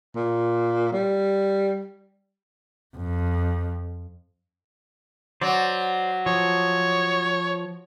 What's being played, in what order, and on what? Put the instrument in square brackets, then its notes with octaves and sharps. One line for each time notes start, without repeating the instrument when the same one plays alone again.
[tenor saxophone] A#2
G3
[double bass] F2
[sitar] F#3 [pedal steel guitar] C5 D5
[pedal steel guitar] F3 [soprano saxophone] C#5